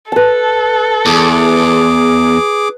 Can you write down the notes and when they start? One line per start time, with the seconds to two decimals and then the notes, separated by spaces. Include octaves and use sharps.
0.12 A4 B4 A5
1.06 E2 G#4 D6